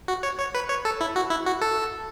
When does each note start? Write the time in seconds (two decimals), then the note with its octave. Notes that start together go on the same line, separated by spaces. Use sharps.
0.08 F#4
0.23 C#5
0.39 C#5
0.55 B4
0.69 C#5
0.85 A4
1.01 E4
1.16 F#4
1.30 E4
1.46 F#4
1.61 A4